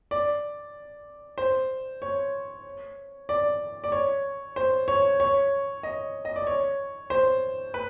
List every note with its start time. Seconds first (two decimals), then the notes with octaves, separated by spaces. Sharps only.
0.11 D5
1.38 C5
2.02 C#5
3.29 D5
3.84 D5
3.92 C#5
4.56 C5
4.88 C#5
5.20 C#5
5.83 D#5
6.25 D#5
6.36 D5
6.47 C#5
7.10 C5
7.74 B4